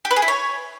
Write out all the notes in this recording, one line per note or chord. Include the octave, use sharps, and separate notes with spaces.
G4
B4
G#4
E4
C#5